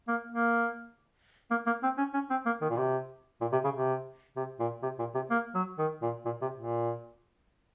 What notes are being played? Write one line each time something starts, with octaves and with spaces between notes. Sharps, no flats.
A#3
A#3
A#3
A#3
C4
C#4
C#4
C4
A#3
D#3
A#2
C3
A#2
C3
C#3
C3
C3
A#2
C3
A#2
C3
A#3
F#3
D#3
A#2
A#2
C3
A#2